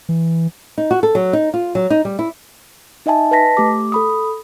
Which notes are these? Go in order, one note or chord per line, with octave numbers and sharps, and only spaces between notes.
E3
D#4
F#4
A4
F#3
D#4
F4
F#3
D#4
G3
E4
D#4 D#5 E5 G#5 A5
B4 D#5 A5 A#6 B6
A3 G4 D6
A4 B5 D#6